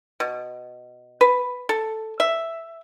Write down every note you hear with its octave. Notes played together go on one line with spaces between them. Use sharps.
B2
B4
A4
E5